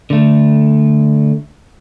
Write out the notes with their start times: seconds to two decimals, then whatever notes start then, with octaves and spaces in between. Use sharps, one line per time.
0.10 D3 A3